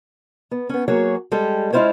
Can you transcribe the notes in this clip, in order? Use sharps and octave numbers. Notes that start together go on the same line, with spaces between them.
B3
B3 C#4
F#3 A#3 F#4 G#4 C#5
G3 G#3 G4 A4
G#3 C#4 E4 F4 C5 C#5